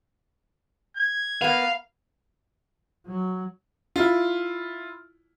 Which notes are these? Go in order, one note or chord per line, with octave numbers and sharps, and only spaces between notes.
G#6
A#3 B3 F5
F#3
E4 F4